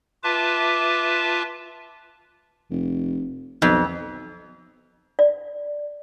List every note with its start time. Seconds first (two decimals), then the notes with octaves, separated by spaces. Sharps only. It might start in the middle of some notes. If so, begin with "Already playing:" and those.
0.24 F4 B4 E5 A5 D6
2.70 F1
3.62 B1 F2
5.19 D5